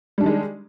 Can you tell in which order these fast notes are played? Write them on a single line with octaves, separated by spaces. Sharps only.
G3 D4 D#3 G#3